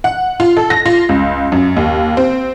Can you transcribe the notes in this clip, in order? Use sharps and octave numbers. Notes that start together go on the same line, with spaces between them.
F#5
F4
A4
A#6
F4
C#2
F#2
D#2
C4